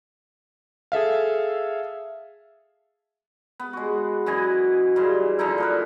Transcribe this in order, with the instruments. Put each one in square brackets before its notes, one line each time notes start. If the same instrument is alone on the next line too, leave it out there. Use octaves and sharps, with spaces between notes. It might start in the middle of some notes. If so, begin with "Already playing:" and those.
[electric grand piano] G#4 A4 E5 F5
[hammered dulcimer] B3
G#3 F#4
F#2 E3 D#5 G#5
G2 C#3 C6
D3 F3 D#4 E4
A#2 A#4 B4